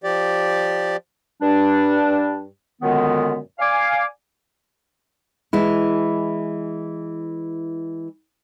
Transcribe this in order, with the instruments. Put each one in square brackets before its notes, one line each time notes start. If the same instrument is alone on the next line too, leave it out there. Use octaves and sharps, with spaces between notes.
[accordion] F3 G4 D5
[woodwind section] G2 G3 D4
F#2 A#2 D3 D#3 G#3 B3
D5 F5 G#5 D6
[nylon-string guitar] E3 G#3 E4